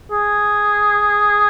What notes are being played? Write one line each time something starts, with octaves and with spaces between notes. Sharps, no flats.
G#4